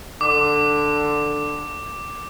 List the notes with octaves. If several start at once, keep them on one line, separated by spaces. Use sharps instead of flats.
D3 D6